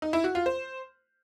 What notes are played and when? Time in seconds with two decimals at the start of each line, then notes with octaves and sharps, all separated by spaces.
0.02 D#4
0.13 E4
0.24 F#4
0.35 F4
0.46 C5